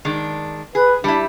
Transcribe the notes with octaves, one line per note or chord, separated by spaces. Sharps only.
D#3 G#3 D4
G#4 B4
G3 D4 E4